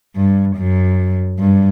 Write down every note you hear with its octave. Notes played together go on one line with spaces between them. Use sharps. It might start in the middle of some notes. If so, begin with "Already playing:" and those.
G2
F#2
G2